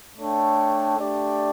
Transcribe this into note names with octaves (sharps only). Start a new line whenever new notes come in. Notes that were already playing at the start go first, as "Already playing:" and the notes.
A3 D4 A4 C#5 G5
A3 D4 G4 D5